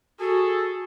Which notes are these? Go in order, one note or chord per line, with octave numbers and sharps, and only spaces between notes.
F#4 G#4 A4